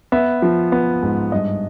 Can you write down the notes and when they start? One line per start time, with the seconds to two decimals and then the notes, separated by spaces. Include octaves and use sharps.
0.12 B3 E5
0.42 F3
0.72 B3
1.03 G#2
1.32 G2 D#5